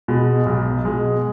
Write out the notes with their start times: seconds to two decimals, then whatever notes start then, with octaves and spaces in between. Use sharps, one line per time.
0.08 B2 G#3
0.46 B1
0.85 B2 G#3